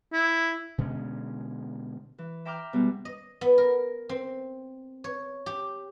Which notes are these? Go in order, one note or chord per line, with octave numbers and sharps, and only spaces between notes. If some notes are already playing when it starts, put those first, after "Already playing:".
E4
B2 D3 G#3 C#4
E3
E5 G5 A#5 D6 F6 G6
B2 G3 G#3 B3
D#5
B3
A#4
C4
C#5
G4